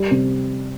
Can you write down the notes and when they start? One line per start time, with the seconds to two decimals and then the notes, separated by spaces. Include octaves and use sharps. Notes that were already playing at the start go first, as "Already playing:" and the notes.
Already playing: G3
0.11 C3